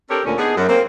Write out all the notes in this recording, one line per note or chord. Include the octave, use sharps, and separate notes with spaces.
C4 D4 G4 A4 A#4 C#5
D2 A#2 C#4
B3 D4 D#4 G#4
F#2
A#3 C4